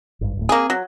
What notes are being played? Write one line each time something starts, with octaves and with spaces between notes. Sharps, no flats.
G#1 G2
D1 A2
A#3 C4 G#4
F#3